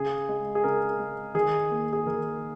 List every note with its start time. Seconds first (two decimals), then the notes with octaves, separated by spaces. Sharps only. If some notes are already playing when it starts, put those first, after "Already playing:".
Already playing: C#3 G#4
0.29 G#3
0.55 G#4
0.64 C#3 A#4
1.00 G#3
1.34 D#3 G#4
1.71 A#3
1.93 G#4
2.06 D#3 A#4